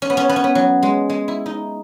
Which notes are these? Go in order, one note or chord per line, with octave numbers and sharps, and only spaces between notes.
C#4
B3
C#4
B3
C#4
B3
F#3
G#3
G#3
E4
D#4